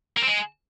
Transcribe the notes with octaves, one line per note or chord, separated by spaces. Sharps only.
A#3
C4
G#3